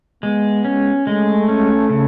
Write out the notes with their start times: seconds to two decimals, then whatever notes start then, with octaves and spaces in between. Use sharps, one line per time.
0.23 G#3 B3
0.65 C#4
1.07 G#3 A3
1.48 C#4
1.89 C#3